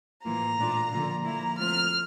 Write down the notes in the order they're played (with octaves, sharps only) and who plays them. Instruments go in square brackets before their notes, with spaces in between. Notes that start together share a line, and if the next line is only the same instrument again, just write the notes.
[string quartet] A2 E3 A#3 F4 A#5
A#2 A3 D4 F4
D3 F3 A#3 F4
F3 A#3 E4 A#5
F3 A3 C4 F4 F6